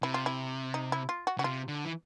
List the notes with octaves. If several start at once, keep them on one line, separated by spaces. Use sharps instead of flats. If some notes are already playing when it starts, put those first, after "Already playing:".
C3 E4
F4
E4
D#4
E4
F4
F#4
C#3 F#4
C3 F4
D3
E3